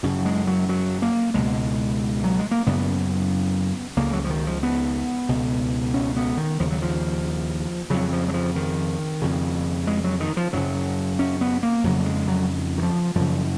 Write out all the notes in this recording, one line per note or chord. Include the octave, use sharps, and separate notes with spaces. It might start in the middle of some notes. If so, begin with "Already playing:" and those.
F#2 C#3 F#3
G#3
F#3
F#3
A#3
C#2 B2 G#3
F#3
G#3
A#3
F#2 C#3 B3
C#2 C#3 A#3
F#3
F3
D#3
F3
B3
C#2 B2
C#4
B3
D#3
D#2 C#3 F3
F#3
F3
F2 C#3 F#3
F3
F#3
F3
D#3
F2 C#3
G#3
F#3
D#3
F3
F#2 C#3 F#3
C#4
B3
A#3
F2 C#3 F#3
G#3
F#3
D#3
F3
F#2 C#3 F3